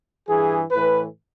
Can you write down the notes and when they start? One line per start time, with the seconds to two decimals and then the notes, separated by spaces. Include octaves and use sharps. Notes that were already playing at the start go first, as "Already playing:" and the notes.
0.29 G2 E3 G#4
0.72 A2 E3 B4